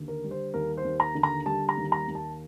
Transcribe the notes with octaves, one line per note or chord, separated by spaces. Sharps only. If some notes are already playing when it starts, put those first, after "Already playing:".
Already playing: D#2 D3
A#4
G3
C5
D#2 A#4
C5
D#2
A#5
D3
A#5
G3 A5
A#5
D#2
A#5
D#2
A5